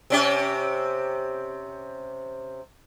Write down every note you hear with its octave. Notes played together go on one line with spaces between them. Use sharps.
C3 C#4 G4